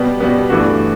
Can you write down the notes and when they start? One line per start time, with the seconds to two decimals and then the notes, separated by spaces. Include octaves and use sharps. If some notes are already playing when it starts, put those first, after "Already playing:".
Already playing: B2 G3 B3
0.20 B2 G3 B3
0.50 G2 E3 A3 D4 F#4